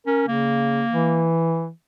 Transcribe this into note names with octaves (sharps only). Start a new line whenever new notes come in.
C#4 A#4
C#3 A#3
E3